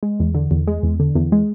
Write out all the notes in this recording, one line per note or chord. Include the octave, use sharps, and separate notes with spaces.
G#3
E2
D3
E2
G#3
E2
D3
E2
G#3